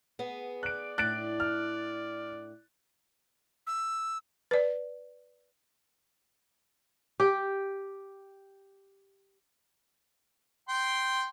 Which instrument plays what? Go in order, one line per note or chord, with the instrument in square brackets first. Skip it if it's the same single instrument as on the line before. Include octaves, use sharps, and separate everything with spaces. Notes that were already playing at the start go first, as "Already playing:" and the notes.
[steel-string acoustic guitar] B3 G#4
[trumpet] D5 [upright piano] F#6 D7
[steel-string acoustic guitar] A2 D4 [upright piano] F#6 A6 D7
[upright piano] F6
[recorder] E6
[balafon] B4 D5
[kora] G4 G5
[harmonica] G5 C6